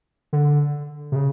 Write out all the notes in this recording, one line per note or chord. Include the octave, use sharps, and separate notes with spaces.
D3
C3
C#3